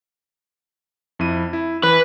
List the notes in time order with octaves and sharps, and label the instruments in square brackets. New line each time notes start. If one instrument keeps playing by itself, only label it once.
[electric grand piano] F2 E4 D#7
E4
[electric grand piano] E3 [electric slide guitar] B4